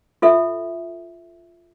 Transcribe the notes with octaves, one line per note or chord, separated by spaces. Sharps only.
F4 A4 E5